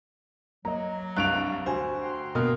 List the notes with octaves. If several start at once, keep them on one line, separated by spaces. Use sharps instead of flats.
F#3 A#3 D#5 A#5
C2 G2 F5 C#6 F#6 D7 F7
D2 F#4 C5 G#5
G5 A#5 C6
B2 A#3 A#4 F6